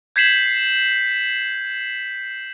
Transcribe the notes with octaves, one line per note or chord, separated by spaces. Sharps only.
G6 G#6 B6 C7 E7 F#7